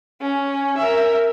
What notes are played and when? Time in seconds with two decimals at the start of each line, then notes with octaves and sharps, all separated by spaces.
0.21 C#4
0.77 A#4 E5